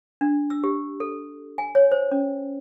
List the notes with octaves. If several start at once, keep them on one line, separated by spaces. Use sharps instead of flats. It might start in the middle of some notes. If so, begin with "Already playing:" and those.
D4
E6
G4
A4
G#5
C#5
C5
C#4